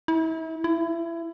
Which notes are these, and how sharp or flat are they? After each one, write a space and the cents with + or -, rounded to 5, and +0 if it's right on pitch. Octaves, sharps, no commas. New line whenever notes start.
E4 -35
E4 +25